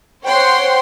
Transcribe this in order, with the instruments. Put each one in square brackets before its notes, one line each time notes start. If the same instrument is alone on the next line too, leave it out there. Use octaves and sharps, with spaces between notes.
[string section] C5 C#5 F#5 G5 C6